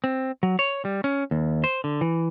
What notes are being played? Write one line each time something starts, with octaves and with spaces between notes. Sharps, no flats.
C4
F#3
C#5
G3
C#4
D#2
C5
D3
E3